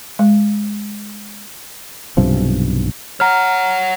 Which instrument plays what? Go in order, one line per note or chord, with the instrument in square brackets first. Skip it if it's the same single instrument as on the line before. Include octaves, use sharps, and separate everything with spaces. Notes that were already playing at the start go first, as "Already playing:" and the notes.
[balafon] G#3
[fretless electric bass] B1 G2 C3 F3
[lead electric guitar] C#5 F#5 [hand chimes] A#5 F6